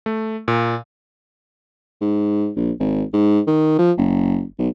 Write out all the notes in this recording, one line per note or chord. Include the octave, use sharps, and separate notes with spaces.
A3
A#2
G#2
A#1
G#1
G#2
D#3
F3
F#1
B1